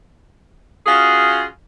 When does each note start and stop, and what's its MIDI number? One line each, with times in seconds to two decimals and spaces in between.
0.86 1.43 61
0.86 1.43 65
0.86 1.43 66
0.86 1.43 68